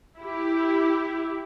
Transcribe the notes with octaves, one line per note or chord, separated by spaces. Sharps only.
E4 G4